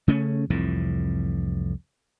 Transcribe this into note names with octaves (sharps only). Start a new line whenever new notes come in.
C#3 A3 C#4
C2 F2 A2 E3